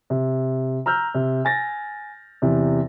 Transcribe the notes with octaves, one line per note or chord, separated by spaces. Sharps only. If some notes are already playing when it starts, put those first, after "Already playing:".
C3
A#5 E6 F6 G6
C3
G#5 A6 A#6
E2 C3